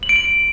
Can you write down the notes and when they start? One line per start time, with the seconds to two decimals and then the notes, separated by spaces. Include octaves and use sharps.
0.03 F#7
0.09 D7
0.16 F#7